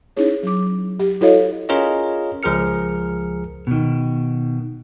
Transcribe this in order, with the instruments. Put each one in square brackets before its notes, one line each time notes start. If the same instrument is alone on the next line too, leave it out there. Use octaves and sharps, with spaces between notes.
[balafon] C#4 D#4 E4 G#4 C#5
F#3 D6
G4
E4 F#4 A4 C#5 D#5 F5
[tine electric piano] C#4 F4 G#4 A#4 C#5 D#5
C#2 F3 G#4 A#4 F6 C#7
[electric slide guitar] B2 D#3